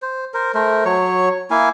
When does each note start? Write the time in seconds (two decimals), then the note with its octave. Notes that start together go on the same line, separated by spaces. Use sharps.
0.02 C5
0.34 A#4 C5
0.54 A3 A#4 C5
0.85 F#3 C#5 C#6
1.51 A#3 E4 F5 G#5